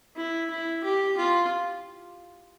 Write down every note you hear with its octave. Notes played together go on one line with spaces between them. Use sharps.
E4
E4
G4
F4